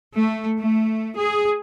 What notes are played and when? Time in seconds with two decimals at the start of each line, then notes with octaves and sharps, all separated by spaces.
0.12 A3
0.58 A3
1.16 G#4